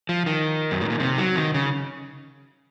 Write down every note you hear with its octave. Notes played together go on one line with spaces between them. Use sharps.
F3
D#3
F#2
A2
A#2
C3
F#3
D#3
C#3